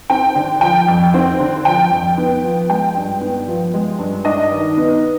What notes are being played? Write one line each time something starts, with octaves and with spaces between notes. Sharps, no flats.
C4 G5
D3
F3 G5
F2
C4
D3
F3 G5
F2
B3
F3
G#3 G5
G2
B3
F3
G#3
G2
D4 D#5
D#3
B3